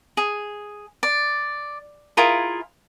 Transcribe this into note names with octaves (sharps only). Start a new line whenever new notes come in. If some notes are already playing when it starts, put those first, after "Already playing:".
G#4
D5
E4 F4 G#4 A#4